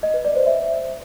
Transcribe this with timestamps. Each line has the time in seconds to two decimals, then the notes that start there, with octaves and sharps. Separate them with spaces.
0.03 D#5
0.14 B4
0.25 D5
0.35 C5
0.46 E5